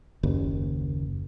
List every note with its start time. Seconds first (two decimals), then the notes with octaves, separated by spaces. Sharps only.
0.23 F#1 D#2